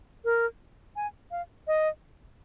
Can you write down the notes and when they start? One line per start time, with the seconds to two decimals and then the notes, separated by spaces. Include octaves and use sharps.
0.25 A#4
0.96 G#5
1.31 F5
1.67 D#5